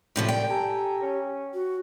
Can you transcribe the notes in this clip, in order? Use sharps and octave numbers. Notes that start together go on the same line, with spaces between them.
C2 A2 C3 F3
D5 G5
G4 A4 G#5 A#5
C#4
F#4